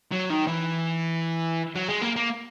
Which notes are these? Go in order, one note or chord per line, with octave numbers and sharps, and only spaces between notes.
F#3
D#3
E3
F#3
G#3
A#3
A#3